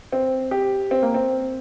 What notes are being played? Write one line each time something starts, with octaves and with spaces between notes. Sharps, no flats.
C4
G4
C4
A#3
C4